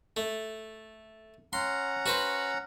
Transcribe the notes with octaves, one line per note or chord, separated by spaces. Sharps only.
A3
C#4 F#5 A#5 C6
F#4 B4 C5